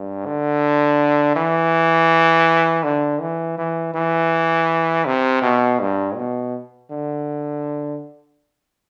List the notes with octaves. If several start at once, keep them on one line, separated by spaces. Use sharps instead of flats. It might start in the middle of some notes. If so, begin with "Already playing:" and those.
Already playing: G2
D3
E3
D3
E3
E3
E3
C3
B2
G2
B2
D3